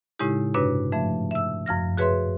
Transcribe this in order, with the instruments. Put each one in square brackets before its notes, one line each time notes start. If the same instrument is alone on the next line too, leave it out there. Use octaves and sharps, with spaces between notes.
[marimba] A2 C#3 G#3 D#4 E4 G4
G2 C3 D4 F#4 B4 C#5
G#2 F3 A3 E5
E5 E6
F#2 F3 F6 A#6
F#4 G#4 B4 C#5 E5 C6